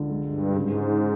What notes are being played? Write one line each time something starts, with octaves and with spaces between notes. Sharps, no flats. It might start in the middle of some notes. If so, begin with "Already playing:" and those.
Already playing: C#2 D3
G#3
G2
G#2 C#3